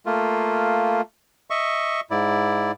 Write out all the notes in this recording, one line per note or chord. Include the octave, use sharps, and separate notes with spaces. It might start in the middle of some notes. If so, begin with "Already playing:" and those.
A3 A#3 F4
D#5 E5 C#6
G#2 E4 D5